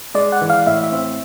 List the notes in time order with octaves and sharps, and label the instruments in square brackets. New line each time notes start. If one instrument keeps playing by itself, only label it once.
[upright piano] G#3 [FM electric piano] D5
[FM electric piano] F#5
[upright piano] E3
[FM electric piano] F5
[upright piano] A2 [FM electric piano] E5
[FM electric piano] E5
[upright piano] C4